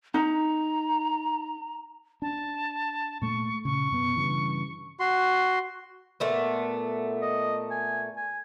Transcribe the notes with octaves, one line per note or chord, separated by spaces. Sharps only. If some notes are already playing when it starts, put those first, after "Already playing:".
D#4 A#5
D4 A5
A#2 A3 C#6
A#2 C#3 C#6
F#2 B2 B3
G2 C#3 E3
F#4 C6
A#2 A3 B3
D#5
G#5
G#5